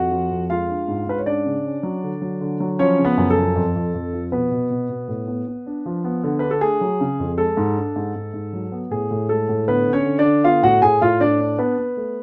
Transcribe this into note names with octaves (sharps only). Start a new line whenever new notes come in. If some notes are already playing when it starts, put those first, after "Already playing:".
Already playing: F2 F#4 F#5
F3
F2
G#3 F4 F5
D4
G#2
G#2 B4
C#5
C#4 D4 D5
C#3
C#4
F#3
D3
F#3
D3
F#3
F3 C#4 C#5
C#3
B3 B4
F#2
A4
F3
F2
F2
F2
F3
B2 B3 B4
B2
B2
B2
A2
B3
B3
D4
F3
B3
D3
D4 B4
A4
A3 G#4
F#3
C#3
F2
G#3 A4
G#2
D4
G#2
G#2
G#2
F#3
B3
A2 G#4
A2
G#3 A4
A2
D3 B3 B4
D3
C#4 C#5
D3
D4 D5
D3
B3 F4 F5
A2 F#4 F#5
A2 G#4 G#5
A2 F4 F5
A2 D4 D5
D4
B3 B4
B3
A3